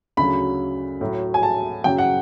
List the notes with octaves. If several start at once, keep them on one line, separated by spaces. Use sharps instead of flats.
D2 C#3 F#3 B5
A2 F#3
G#5
A5
F#2 C#3 F#3 G5
F#5